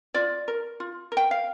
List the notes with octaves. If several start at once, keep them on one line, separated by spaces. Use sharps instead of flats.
F4 D5
A#4
F4
A#4
G5
F5